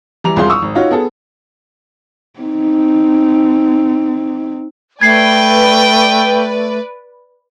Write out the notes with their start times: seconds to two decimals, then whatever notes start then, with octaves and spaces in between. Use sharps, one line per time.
0.24 E3 G3 A#5 F7
0.36 E1 C2 F4 G#4 F5 C6
0.50 C#6 D#6 E6
0.62 G#1
0.75 D#4 F4 F#4 C#5
0.91 B3 G#4 A4
2.40 C4 D#4
5.01 A3 B4 D5 G5 G#6 C7